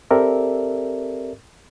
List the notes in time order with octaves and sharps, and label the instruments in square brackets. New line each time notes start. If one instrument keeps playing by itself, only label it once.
[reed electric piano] C4 G4 A4 A#4 D5 E5